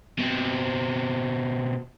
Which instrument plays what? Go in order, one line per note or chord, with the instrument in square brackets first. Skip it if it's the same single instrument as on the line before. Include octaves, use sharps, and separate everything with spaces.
[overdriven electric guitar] B2 C4